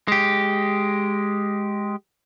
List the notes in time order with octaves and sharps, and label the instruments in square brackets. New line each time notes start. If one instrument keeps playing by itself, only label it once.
[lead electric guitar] G#3 G4